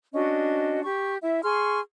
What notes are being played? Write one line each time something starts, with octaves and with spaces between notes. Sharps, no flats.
C#4 D4 F#4 D#5
G4 C#6
E4 E5
G#4 C6 C#6 F6